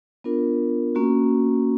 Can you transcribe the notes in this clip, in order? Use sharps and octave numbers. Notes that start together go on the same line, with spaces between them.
B3 D4 F4 A#4
A#3 C#4 F#4